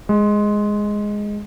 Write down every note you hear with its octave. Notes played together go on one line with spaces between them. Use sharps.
G#3